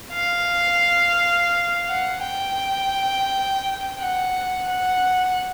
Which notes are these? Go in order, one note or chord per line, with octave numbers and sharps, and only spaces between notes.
F5
F#5
G5
F#5
F#5